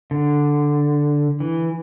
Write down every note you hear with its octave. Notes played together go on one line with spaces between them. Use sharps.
D3
E3